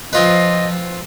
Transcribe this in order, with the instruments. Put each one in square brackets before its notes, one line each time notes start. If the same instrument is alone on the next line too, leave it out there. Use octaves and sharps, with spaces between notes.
[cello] F3 [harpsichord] C4 F4 B4 [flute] D#5